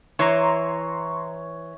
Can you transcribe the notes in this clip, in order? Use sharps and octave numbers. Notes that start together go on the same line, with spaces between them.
E3 C#5 A#5 C6 C#6